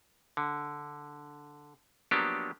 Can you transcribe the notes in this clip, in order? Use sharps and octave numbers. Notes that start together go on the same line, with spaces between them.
D3
F3 F#3 A#3 B3 D4 G4